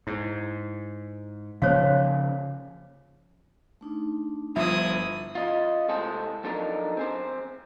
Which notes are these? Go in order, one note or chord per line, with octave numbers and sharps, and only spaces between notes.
G#2 E4
C#3 F3 A#3 C5 C#5 F5
A3 D4 D#4
G1 F3 G3 E4 C5 E5 D#6
F4 D#5
A2 C3 G#3 G#4 A4 C5
F3 F#3 D4 D#4 A4 A#4
C4 G#4 C5